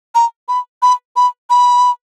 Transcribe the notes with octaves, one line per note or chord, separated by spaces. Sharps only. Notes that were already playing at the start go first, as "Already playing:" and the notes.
A#5
B5
B5
B5
B5